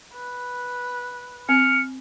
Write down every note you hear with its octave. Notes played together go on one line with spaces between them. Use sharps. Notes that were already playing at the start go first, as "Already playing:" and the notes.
B4
C4 F6 C#7